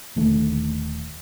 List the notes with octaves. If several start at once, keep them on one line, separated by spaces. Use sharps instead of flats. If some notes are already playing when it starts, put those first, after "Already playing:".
D#1 D3 D#3 A3